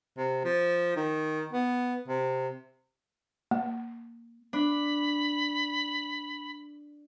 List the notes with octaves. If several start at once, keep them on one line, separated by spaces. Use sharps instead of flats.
C3
F3
D#3
B3
C3
A#3
D4 B5